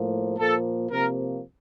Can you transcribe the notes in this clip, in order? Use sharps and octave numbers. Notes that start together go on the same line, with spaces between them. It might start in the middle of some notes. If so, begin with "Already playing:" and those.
Already playing: A2 F3 A#3
A#2 F3 A#3 A4
C3 F3 A#3 A#4